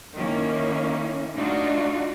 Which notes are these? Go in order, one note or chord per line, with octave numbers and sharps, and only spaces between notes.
D#3 A#3 C#4 E4
A3 D4 D#4 F4 F#4